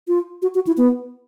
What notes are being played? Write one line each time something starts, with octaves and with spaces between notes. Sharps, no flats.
F4
F#4
F#4
E4
B3